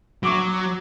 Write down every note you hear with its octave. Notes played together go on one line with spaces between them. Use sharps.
F#3 C#6 D6 D7